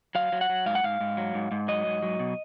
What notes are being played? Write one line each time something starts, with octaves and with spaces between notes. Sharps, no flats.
F#3 F5
F#3
F#5
F#3
G#2 F5
F#5
G#2 F5
G#2
F#3
G#2
G#2
F#3 D#5
G#2
F#3
B2